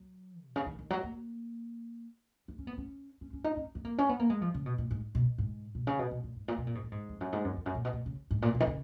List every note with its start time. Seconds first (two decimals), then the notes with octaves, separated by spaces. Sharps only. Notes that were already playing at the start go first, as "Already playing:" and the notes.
Already playing: F#3
0.44 B2
0.56 C#3
0.66 D#3
0.79 D#3
0.90 F#3
1.03 A#3
2.48 D#4
2.58 C#4
2.67 B3
2.78 C#4
3.21 C#4
3.33 C#4
3.44 D#4
3.57 C#4
3.75 B3
3.85 A#3
3.98 C#4
4.09 B3
4.19 A#3
4.30 G#3
4.41 F3
4.54 C#3
4.66 B2
4.78 A#2
4.91 G#2
5.15 B2
5.38 G#2
5.75 B2
5.87 C#3
5.99 B2
6.11 B2
6.24 A#2
6.36 G#2
6.48 A#2
6.58 B2
6.67 A#2
6.75 G#2
6.84 A#2
6.92 G#2
7.09 F2
7.21 F#2
7.33 G#2
7.45 F#2
7.57 F2
7.66 F#2
7.75 A#2
7.85 B2
7.93 A#2
8.06 C#3
8.31 G#2
8.42 A#2
8.55 B2
8.60 D#3
8.67 C#3